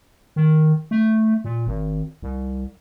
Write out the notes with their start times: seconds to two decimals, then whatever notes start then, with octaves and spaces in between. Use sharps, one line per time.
0.36 D#3
0.91 A3
1.44 A#2
1.67 G#1
2.22 C2